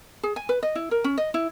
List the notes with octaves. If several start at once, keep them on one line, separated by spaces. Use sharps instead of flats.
G#4
G#5
B4
D#5
E4
A#4
C#4
D#5
E4